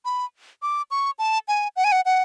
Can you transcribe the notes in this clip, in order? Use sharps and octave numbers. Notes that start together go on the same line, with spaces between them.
B5
D6
C#6
A5
G#5
F#5
G#5
F#5
F#5